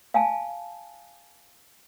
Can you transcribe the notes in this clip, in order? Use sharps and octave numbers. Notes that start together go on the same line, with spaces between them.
F5 G#5 A5